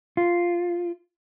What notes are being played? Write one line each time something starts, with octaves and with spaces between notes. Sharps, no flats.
F4